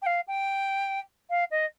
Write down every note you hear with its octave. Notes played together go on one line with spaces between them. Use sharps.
G5
F5
G5
F5
D#5